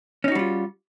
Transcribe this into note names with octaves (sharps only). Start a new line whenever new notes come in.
G3 C#4 D#4 F4 F#4